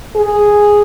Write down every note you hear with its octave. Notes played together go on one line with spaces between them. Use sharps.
G#4